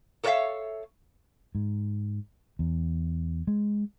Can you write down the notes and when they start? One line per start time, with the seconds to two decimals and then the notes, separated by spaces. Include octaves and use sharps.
0.24 A4 A#4 C#5 D5 E5 F5
1.55 G#2
2.59 E2
3.47 G#3